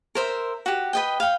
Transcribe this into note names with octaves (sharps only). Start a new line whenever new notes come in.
A#4 C5 E5
F#4 G4
B4 D#5 G5
F5 G5